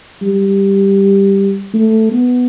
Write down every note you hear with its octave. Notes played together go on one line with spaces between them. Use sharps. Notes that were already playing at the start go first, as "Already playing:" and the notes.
G3
A3
B3